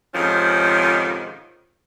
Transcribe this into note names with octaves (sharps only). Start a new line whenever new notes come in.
F2 G#2 C3 D#3 F3 C#4